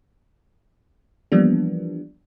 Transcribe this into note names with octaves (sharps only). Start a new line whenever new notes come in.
E3 F3 G3 A#3 B3 D4